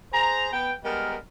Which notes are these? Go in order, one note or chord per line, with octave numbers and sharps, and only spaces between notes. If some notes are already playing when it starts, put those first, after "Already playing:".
G#4 C5 A#5
B3 G5
G3 G#3 B3 A#4